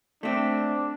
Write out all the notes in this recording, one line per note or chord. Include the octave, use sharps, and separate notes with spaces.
A3 C4 D4